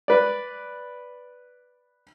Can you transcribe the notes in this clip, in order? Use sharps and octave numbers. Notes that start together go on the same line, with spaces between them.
B4 D5